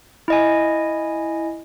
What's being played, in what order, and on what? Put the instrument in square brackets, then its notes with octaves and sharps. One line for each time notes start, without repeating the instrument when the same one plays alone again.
[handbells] E4 D#5 G#5